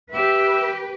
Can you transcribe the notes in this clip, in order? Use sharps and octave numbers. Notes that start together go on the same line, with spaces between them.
G4 B4 E5